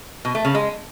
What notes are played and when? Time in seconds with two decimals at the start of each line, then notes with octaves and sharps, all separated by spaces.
0.25 B2
0.35 A3
0.45 C#3
0.55 G#3